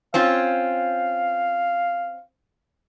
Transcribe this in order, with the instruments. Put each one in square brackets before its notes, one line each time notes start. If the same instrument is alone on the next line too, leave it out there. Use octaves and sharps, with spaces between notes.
[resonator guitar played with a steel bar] C4 C#4 F4 [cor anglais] F5